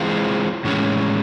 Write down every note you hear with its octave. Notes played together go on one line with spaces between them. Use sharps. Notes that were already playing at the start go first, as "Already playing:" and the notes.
Already playing: E3 G#3 C4 F4 G#4
A2 E3 G#3 C#4